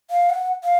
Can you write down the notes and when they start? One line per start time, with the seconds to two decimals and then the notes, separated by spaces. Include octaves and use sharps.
0.11 F5
0.30 F#5
0.64 F5